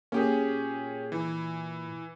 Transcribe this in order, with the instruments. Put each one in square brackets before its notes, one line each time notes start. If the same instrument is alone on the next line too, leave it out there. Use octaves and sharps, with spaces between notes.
[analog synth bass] A#2 [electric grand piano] C#4 G4 G#4
[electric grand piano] E3